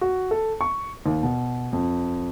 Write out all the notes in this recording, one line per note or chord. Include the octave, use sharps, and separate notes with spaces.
F#4
A4
C#6
D#2
B2
F2